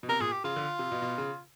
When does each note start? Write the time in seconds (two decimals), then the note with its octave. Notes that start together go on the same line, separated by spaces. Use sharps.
0.03 B2
0.09 C3 A#4
0.20 A#2 G#4
0.32 G4
0.44 C#3 F4
0.56 D3
0.79 C3
0.92 B2
1.02 B2
1.18 C#3